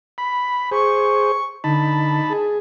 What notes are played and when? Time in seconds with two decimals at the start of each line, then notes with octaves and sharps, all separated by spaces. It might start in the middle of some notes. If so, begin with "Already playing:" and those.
0.18 B5
0.71 G#4 C5 C#6
1.64 D3 D#4 A5 B5
2.30 G#4